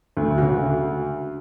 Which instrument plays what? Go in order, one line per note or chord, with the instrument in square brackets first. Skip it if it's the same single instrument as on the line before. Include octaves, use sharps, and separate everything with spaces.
[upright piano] D2
[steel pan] C#3 F#4